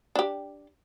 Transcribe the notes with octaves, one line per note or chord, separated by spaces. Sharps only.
D4 G4